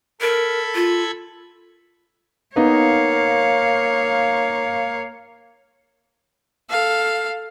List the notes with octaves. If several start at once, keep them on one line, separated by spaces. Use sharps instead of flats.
A4 A#4 B5 G#6
F4
A#3 B3 D#4 C#5 F5
A4 F5